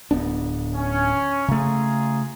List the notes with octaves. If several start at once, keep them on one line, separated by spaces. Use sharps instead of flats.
D1 B3 D4
C#4
C#3 A3 F4 G#4 A#5